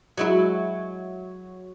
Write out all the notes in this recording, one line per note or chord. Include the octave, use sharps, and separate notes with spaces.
F#3 G#3 E4